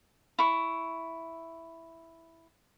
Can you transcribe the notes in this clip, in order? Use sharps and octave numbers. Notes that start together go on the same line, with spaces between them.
E4 C#6